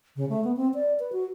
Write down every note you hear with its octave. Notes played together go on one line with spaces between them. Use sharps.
C#3
A3
B3
C4
D5
B4
F#4